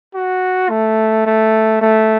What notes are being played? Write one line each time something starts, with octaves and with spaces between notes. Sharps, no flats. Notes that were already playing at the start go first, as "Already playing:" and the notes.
F#4
A3
A3
A3